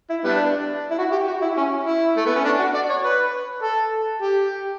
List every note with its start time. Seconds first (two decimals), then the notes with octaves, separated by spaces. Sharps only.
0.10 E4
0.24 G3 B3 D4
0.91 E4
0.98 F#4
1.12 G4
1.28 F#4
1.42 E4
1.57 C#4
1.86 E4
2.17 A3
2.26 B3
2.36 C#4
2.45 D4
2.59 F#4
2.75 D5
2.90 C#5
3.04 B4
3.63 A4
4.22 G4